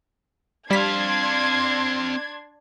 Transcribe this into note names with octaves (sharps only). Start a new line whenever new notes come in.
G3 C4 D4 F5 C6 G#6 B6